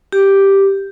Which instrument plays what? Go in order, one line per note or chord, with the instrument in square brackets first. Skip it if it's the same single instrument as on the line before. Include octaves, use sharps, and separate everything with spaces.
[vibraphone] G4